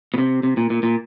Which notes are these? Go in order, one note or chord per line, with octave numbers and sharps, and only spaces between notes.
B2
C3
C3
A#2
A#2
A#2